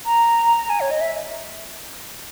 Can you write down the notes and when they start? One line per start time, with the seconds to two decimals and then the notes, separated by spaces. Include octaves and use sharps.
0.06 A#5
0.70 G#5
0.81 C#5
0.91 D#5
1.01 E5